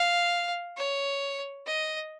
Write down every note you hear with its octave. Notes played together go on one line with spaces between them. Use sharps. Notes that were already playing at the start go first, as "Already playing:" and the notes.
Already playing: F5
C#5
D#5